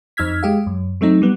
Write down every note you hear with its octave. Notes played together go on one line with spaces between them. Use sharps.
F2 D#4 E6 F6 G#6 B6
G#3 G4 F5
F#2
F#3 A3 C4 D#4
G3 B3